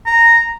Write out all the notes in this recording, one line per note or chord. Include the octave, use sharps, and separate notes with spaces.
A#5